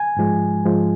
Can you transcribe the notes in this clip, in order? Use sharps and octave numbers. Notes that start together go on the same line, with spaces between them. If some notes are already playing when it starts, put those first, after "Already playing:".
Already playing: G#5
G#2 F3 G#3
G#2 F3 G#3